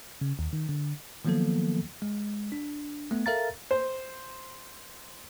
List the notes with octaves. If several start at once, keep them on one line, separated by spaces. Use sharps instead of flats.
C#3
D#2
D#3
D3
D#3 F3 F#3 A#3 B3 A4
G#3
D4
A3 B3
A4 A#4 E5 F5 A#5 A6
C5